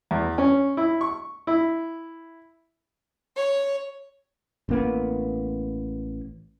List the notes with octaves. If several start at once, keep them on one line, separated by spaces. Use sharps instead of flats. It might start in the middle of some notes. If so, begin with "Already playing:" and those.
E2
C#4
E4
C#6
E4
C#5
A1 A#3 B3